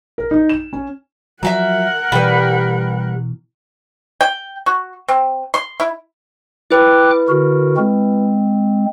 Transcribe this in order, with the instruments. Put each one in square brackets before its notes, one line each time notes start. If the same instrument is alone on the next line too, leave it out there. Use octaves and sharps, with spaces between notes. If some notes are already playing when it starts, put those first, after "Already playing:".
[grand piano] A#4
D#4
E7
C#4
[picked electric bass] F3 F#3 [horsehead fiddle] A#4 F#5 [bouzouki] E5 A5 A#5
[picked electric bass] B2 E3 [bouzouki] G3 B4
[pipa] G5
F#4
C4
C6
E4
[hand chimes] E4 B4 [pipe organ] G5 D6 F#6
[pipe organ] D3 F#4 A#4
G#3 C4